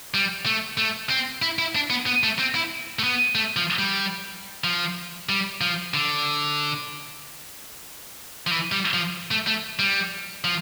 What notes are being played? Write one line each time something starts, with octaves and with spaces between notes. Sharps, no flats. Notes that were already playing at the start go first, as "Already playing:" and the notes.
G3
A3
A3
C4
E4
E4
D4
B3
B3
A3
C4
E4
A3
B3
A3
F3
G3
F3
G3
F3
D3
F3
E3
G3
F3
A3
A3
G3
F3